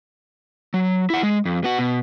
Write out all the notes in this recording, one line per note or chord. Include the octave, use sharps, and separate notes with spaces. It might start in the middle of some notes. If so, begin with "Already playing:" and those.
F#3
E4 F#5
G#3
F2
B3 F#4
B2